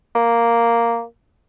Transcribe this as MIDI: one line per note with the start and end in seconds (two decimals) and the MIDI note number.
0.15 1.03 58